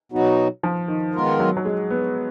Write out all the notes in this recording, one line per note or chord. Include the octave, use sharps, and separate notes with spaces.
B2 F#3 B3 D#4 F#4
F3
D#3
D#3 G#3 B3 F4 A#4
F#3
F#3
G#3
B3